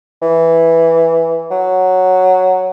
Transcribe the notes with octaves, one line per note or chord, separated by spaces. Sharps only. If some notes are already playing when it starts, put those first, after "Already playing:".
E3
F#3